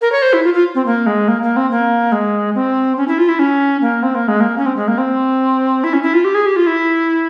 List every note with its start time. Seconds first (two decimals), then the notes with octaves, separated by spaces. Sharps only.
0.01 A#4
0.12 C#5
0.22 C5
0.33 E4
0.44 F4
0.54 F4
0.75 C4
0.86 A#3
1.07 G#3
1.28 A#3
1.43 A#3
1.56 C4
1.71 A#3
2.12 G#3
2.55 C4
2.97 C#4
3.08 E4
3.18 F4
3.29 E4
3.39 C#4
3.82 A#3
4.03 C4
4.15 A#3
4.28 G#3
4.41 A#3
4.58 C#4
4.66 C4
4.77 G#3
4.88 A#3
4.98 C4
5.84 E4
5.93 C#4
6.03 E4
6.14 F4
6.24 G4
6.35 G#4
6.46 G4
6.56 F4
6.67 E4